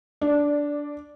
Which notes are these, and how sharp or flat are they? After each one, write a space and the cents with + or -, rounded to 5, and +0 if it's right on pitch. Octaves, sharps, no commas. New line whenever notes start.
D4 -10 D5 +5